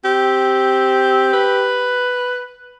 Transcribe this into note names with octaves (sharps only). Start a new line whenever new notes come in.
C4 G4
B4